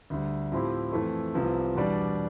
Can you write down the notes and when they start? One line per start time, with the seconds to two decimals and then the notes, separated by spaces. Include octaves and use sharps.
0.10 D2 D3 G3
0.52 A2 F3 C4 E4 G4
0.93 F2 E3 A3
1.34 C2 C3 F3 B3
1.75 E2 B2 G3 D4